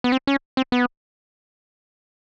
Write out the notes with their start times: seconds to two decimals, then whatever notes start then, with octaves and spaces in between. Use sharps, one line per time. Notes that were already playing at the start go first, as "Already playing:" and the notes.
0.04 B3
0.12 C4
0.27 C#4
0.57 C4
0.72 B3